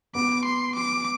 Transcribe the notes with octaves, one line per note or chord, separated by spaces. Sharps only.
B3 D6
C6
D6